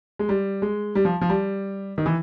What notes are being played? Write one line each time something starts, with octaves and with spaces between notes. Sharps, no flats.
G#3
G3
G#3
G3
F3
F3
G3
D#3
E3